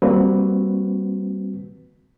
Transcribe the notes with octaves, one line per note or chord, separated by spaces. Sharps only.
G3 A#3 C4 F#4 B4